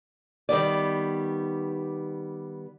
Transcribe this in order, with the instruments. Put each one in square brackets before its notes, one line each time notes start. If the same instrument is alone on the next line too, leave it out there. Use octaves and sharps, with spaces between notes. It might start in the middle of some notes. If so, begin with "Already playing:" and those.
[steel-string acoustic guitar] D#3 G3 B3 D5